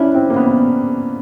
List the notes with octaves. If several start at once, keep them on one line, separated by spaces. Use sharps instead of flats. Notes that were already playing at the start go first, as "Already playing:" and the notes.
Already playing: C#4 D4 E4
C4
A#3
B3